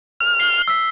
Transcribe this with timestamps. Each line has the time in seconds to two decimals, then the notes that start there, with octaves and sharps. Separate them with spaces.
0.21 F6
0.40 C7 G7
0.68 E6 B6